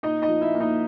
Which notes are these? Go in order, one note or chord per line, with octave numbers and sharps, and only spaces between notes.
A#2 D#4 D#5
D#4 D#5
F3
E4 E5
A#3
D#4 D#5